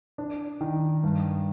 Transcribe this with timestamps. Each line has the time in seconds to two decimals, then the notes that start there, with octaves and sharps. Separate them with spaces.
0.18 D4
0.61 D#3
1.03 G2